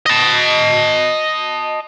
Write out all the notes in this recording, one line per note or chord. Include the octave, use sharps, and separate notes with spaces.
D#5 A5